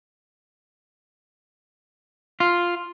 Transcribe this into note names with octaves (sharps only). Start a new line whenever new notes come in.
F4